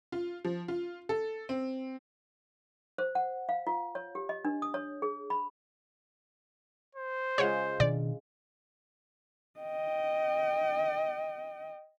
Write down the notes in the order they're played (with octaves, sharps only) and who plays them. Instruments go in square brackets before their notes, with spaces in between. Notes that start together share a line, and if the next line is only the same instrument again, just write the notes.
[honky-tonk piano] F4
F3
F4
A4
C4
[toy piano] C5
F#5
F5
F4
C#5
G4
D#5
D4
D#6
C#5
G#4
B5
[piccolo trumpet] C5
[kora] C#3 G#3 F4 [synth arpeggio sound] C#5 F#5
[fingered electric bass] B2 D#3 D4 [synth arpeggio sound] D5
[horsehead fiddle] D#5 G5